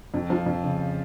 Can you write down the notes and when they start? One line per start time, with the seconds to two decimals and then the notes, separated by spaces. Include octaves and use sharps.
0.14 F2
0.30 F3
0.46 F2
0.63 C#3